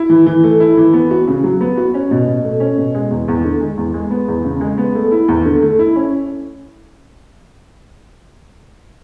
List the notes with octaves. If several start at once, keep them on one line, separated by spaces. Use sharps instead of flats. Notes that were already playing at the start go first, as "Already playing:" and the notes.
Already playing: E4
E3
E3
A3
E4
E3
B3
F#4
C#3
F#3
B3
F#4
C#4
B2
B2
A3
C#4
B2
G#3
E2
E2
D3
G#3
E2
G#3
B3
E2
C#3
G#3
B3
A3
E4
E2
D3
A3
E4
C#4